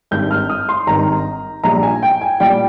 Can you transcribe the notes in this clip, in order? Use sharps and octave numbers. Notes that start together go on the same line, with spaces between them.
G#1 G2 D#3 G6
F6
D#6
C6
G#1 G2 D#3 A#5
A#1 A#2 G3 A#5
G#5
G5
G#5
A#2 G3 G5